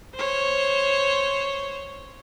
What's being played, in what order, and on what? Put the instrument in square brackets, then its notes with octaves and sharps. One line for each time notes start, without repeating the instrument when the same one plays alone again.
[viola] C5 C#5